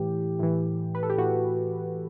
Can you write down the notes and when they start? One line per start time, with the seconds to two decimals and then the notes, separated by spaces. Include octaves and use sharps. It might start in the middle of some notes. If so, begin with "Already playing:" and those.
Already playing: A2 E3 G4
0.39 A2 E3
0.95 B4
1.03 A4
1.10 G4
1.18 A2 E3 F#4